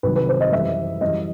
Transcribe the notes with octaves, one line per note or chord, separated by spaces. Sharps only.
C2 C3 D#3 F#3 B4
B4
C5
D#5
F#2 E3 G3 E5
F#2 E3 G3 D#5